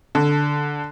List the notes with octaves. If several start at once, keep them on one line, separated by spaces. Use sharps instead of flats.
D3